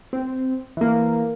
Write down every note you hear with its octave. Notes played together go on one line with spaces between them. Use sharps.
C4
E3 A#3